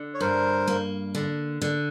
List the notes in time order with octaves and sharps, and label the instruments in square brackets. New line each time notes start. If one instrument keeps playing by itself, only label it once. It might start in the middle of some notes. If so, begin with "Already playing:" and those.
Already playing: [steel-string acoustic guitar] D3
[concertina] C#5
[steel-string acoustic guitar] G2 [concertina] A#4 C5
[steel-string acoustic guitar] A#3
D3
D3